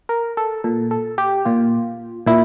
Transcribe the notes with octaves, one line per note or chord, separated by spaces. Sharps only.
A#4
A4
A#2 A4
A4
G4
A#2 F4
A#2 E4